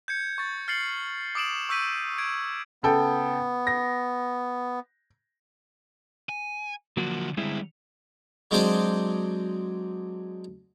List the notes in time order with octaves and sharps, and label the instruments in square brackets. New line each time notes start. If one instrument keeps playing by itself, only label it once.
[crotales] G6 G#6 C#7
C#6 A6
F6 A6 C7 C#7 F#7
D6 D#6 D7 E7 F#7
C#6 E6 G6 B6 D#7
G#6 D7
[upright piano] C#3 A4 G5 [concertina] B3
[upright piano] A#6
[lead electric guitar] G#5
[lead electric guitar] D3 F3 [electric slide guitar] F#3 A#3 F#4
[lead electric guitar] D3 G3 [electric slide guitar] G#3 C4 E4
[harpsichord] F#3 G#3 C4 D4 C5 D#5